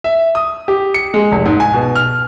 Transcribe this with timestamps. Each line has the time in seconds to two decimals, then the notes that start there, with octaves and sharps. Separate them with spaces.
0.04 E5
0.35 D#6
0.68 G4
0.94 C#7
1.14 G#3
1.32 F1
1.45 G#2
1.60 G#5
1.74 B2
1.95 F6